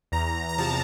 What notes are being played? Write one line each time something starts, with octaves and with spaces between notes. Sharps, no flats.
E2 A#5
A#5
C3 F3 A5